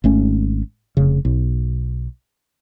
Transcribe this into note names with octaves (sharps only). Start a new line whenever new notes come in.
G#1 A3 C#4
F1 C#3
B1